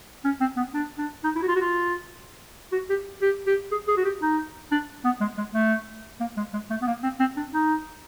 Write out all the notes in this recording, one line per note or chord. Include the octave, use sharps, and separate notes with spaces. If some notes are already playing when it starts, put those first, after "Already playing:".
C#4
C4
B3
D4
D4
D#4
E4
F#4
F4
F#4
F4
F#4
G4
G4
G4
G#4
G#4
F#4
G4
D#4
D4
B3
G#3
G#3
A3
A#3
G#3
G#3
A3
B3
A#3
C4
C4
D4
D#4